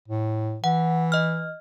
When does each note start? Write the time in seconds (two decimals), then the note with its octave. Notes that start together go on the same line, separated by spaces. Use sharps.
0.08 A2
0.64 E3 F#5
1.12 D#5 F6